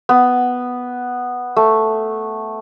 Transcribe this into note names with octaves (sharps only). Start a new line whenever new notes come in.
B3
A3